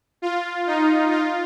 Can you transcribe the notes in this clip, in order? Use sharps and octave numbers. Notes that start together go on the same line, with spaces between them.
F4
D#4
F4